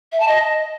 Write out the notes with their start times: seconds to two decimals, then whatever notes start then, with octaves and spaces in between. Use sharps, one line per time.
0.12 E5
0.20 A5
0.28 D#5